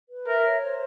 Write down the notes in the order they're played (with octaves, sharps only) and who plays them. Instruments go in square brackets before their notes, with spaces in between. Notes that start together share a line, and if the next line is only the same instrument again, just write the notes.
[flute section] B4
[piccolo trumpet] A#4 [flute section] E5
[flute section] C#5
C5